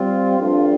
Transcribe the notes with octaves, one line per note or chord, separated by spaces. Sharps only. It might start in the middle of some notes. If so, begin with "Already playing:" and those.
Already playing: G3 C4 F4
G2 F3 A3 D4 F4